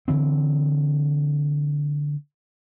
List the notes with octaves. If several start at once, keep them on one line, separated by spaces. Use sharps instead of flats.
D3 E3 C4